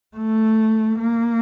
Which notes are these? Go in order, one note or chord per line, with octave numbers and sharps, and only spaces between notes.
A3
A#3